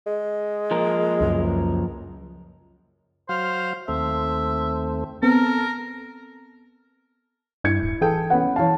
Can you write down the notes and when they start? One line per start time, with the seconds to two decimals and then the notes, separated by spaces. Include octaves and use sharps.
0.06 G#3
0.71 F3 A#3 A#4
1.21 C#2 F#2
3.29 F#3 C5 F5
3.88 D#2 A3 C4 E5
5.23 B3 C4 A4 A#4
7.64 G2 E4 G#6 C#7
7.83 D1
8.01 E3 G#4 A4 G5
8.30 B3 C#4 B4 F#5
8.56 E3 C#5 F5 A5